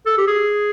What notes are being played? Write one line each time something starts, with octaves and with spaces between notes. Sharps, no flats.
A4
G4
G#4